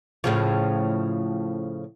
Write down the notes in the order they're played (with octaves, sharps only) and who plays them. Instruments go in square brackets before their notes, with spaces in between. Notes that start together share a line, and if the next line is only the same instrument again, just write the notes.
[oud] A2 C#3 F3